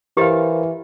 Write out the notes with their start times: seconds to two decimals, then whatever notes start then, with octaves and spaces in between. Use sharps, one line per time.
0.17 E3 G4 A#4 C5 D#5 F5